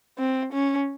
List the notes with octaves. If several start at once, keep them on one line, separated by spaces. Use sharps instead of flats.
C4
C#4